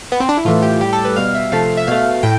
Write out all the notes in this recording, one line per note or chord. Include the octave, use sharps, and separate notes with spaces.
B3
C4
D4
E4
A2 E3 A3 F4
G4
A2 G3 G4
A4
B4
B2 G3 F5
E5
C3 F3 A3 F5
E5
B2 A3 F5
A2 G5